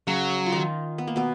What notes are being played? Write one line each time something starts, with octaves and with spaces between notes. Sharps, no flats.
C#3 F#3 C#4
F4
D#3 D#4
B3
A#3
B2 B3